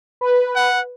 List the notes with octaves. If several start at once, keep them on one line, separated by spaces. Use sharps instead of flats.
B4
F#5